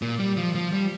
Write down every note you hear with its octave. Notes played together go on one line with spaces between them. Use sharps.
A#2
G3
F3
F3
G3